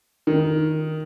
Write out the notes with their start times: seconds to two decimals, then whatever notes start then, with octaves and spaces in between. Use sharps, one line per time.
0.27 D#3